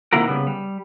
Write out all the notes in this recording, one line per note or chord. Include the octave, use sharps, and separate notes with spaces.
C3 D#3 A#3 E4 F#4 A#4
C#3 G3 B3
G3